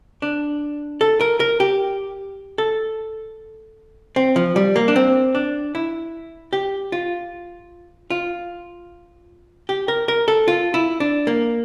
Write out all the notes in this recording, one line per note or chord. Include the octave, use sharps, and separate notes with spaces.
D4
A4
A#4
A#4
G4
A4
C4
F3
G3
A#3
D4
C4
D4
E4
G4
F4
F4
G4
A#4
A#4
A4
F4
E4
D4
A#3